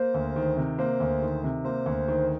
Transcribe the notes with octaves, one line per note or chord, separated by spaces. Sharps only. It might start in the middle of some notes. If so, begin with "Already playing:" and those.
Already playing: A#3 C5
D2
D#3
C3
A#3 C5
D2
D#3
C3
A#3 C5
D2
D#3